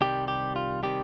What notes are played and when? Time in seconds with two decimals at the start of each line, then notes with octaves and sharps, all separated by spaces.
0.01 C2 C3 D#3 G3 G4
0.28 G4
0.56 F4
0.83 C3 D#3 G3 G4